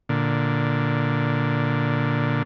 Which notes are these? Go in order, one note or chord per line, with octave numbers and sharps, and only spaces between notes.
A#2 D3